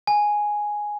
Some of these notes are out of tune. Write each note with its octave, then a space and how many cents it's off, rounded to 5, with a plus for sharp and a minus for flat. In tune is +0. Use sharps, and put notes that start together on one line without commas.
G#5 +0